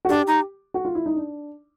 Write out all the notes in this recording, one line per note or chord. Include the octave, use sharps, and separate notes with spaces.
F#4
D4 G4
D#4
F#4
F4
E4
D#4
D4